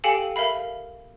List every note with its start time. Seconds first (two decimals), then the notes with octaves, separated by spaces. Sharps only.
0.04 G4 A4 F5 G5 G#5 C#7
0.36 A#4 E5 F5 B5